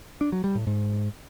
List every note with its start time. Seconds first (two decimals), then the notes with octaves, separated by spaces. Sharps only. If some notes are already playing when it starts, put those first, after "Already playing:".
0.21 D4
0.32 F#3
0.44 G3
0.55 A2
0.67 G#2